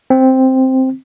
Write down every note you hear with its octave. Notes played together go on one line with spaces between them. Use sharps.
C4